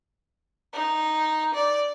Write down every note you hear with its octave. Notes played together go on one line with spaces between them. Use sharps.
D#4
D5